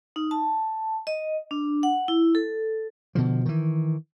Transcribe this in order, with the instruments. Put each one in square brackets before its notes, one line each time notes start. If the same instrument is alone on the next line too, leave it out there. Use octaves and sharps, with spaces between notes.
[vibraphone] D#4
A5
D#5
D4
F#5
E4
A4
[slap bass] B2 D3 F3
D#3 E3